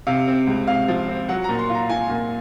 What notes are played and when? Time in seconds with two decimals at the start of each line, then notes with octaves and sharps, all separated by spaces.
0.07 C3 F5
0.28 C4
0.47 C#2
0.67 C3 F5
0.88 F3
1.09 C4
1.29 F#3 F#5
1.44 A#2 A#5
1.59 C6
1.70 F4 A#5
1.89 F4 G#5
2.10 A#2